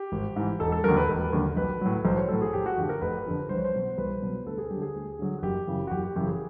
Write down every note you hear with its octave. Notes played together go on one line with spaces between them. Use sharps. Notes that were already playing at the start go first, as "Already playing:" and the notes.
Already playing: G4
G#1
G#2 E3
E1 A4
A4
D#2 D3 F#3 A#4
B4
E1
D#2 D3 F#3
B1 B4
A2 F#3
B1 C5
C#5
A2 F#3 A4
G#4
F1 G4
F#4
F2 D3 F3 G4
A#4
F1 B4
F2 D3 F3
C2 C5
C#5
C5
B2 F#3
C2 B4
B2 F#3
D2 A4
G#4
D3 F#3 G4
G#4
D2
D3 F#3
F#4
F#1 G4
F#2 C#3 E3
F#4
F#1 G4
G4
F#2 C#3 E3 G4
G#4